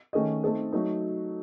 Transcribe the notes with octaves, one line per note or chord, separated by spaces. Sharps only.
D#3 A3 C#4 G#4 D#5
A3 C4 D#4 A4 D#5
F#3 A3 D#4